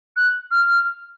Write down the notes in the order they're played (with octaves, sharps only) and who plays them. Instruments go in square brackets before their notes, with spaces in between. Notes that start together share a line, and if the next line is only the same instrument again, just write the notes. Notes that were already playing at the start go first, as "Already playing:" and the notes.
[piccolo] F#6
F6